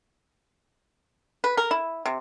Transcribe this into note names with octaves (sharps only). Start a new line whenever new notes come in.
B4
A#4
E4
C3